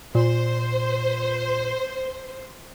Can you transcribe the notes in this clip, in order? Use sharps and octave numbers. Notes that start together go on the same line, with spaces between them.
A#2 C5